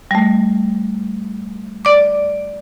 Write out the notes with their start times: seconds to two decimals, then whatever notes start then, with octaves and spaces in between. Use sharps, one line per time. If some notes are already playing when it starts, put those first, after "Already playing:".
0.11 G3 A3
1.85 D5 D6